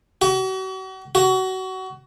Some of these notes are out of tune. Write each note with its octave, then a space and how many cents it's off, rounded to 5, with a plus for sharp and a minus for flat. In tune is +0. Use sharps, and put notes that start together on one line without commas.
F#4 +40
F#4 +25